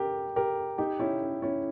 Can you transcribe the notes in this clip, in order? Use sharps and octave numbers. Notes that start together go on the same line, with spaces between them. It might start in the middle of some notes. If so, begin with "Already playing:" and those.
Already playing: G4 A#4
G4 A#4
D#4 G4
C#4 E4
C#4 E4